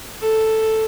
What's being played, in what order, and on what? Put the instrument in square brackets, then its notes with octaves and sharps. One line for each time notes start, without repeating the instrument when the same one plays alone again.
[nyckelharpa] A4